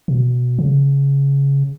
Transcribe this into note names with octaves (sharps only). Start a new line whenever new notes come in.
B2
C#3